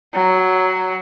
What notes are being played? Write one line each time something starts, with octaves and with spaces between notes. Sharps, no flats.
F#3